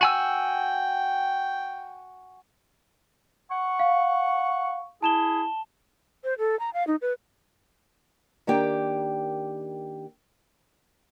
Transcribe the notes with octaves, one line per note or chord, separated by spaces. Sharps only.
F#4 G5 G#5 E6
F#5 C#6
F5
E4 G#4 A5 E7 G7
C5
A4
A#5
F5
D#4
B4
D#3 A#3 D4 G4 G5